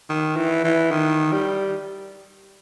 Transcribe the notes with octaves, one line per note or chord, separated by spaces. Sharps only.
D#3
E3
E3
D#3
G3